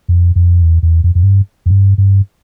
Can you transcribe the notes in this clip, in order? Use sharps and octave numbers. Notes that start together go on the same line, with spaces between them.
F2
F2
E2
E2
F2
F2
G2
F2
G2
G2